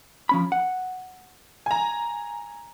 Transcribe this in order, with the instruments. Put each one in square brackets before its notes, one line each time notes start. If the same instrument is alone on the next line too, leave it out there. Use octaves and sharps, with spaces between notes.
[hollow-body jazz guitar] F3 C#4 B5
F#5
[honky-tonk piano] G#5 A#5